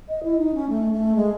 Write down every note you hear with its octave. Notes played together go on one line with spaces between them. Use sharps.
D#5
E4
D#4
C#4
A3
A3
G#3